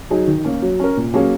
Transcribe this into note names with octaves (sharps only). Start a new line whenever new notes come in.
F#3 D#4 G#4
D#3
A#3 C#4
F#3
C#4 A#4
A#2
F#3 A#3 C#4 G#4